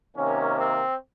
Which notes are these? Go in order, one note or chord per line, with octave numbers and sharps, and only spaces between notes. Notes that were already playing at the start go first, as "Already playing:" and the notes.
C3 D#3 A#3 C#4
C4